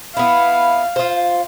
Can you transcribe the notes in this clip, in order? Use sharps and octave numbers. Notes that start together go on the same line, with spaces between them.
B3 E4 F5
F4 C5